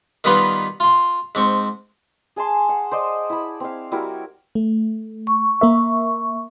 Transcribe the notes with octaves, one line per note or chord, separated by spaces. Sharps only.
D#3 G3 B3 D#4 F4 B4
F4 C6
G#2 C4 C#6
G#4 G#5 A5 C6
F#5
C5 D5 D#5
E4 B5
C4 F5
G3 E4 F#4 A#4
A3
C#6
A#3 A#4 E5